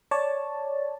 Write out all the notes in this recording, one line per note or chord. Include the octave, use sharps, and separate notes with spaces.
C#5 D5 A5